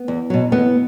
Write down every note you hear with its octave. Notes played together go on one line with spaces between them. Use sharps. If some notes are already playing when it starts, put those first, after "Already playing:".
Already playing: B3
E2
B2 F#3
E2 B3